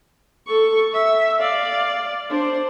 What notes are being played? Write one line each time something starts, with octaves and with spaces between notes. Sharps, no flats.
A4 C#6
E5
D5 F5
D4 C5